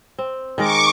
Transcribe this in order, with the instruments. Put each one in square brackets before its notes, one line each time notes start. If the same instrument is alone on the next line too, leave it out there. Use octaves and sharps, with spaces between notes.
[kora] C4
[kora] D#3 G#3 A#4 [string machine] C#6 D6